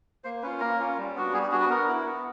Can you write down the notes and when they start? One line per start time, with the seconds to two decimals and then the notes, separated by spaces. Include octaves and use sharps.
0.24 A#3 C5
0.42 C#4 F4 B4
0.60 A#3 A#4
0.79 C#4 F4
0.97 G3
1.15 B3 D4 F#4
1.33 G3 G#4
1.42 G4
1.52 B3 D4 F#4 G#4
1.61 B4
1.69 B3 A#4
1.88 E4
2.06 B3